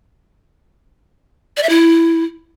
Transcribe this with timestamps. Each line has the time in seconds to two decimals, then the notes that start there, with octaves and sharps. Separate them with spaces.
1.57 D5
1.63 E5
1.69 E4